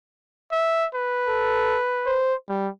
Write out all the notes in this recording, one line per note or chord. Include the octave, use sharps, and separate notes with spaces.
E5
B4
A4
C5
G3